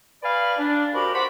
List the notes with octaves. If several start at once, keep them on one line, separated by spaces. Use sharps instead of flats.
B4 D5 F5 G#5 B5
D4
F2 F#4 G4 A#4 B5
C5 F#5 B5 C#6 D6